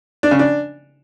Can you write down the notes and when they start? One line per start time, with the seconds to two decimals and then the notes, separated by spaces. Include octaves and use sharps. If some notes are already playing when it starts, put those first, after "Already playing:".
0.23 D4
0.31 C#3
0.39 D4